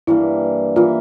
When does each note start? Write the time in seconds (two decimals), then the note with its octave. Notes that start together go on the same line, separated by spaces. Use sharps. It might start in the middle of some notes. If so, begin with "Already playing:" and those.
0.07 G2 E3 A#3 E4
0.76 E3 A#3 F4